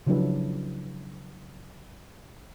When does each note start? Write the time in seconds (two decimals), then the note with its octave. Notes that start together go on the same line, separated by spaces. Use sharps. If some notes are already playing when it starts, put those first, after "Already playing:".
0.07 C#3 F3 F#3 D4 E4 B4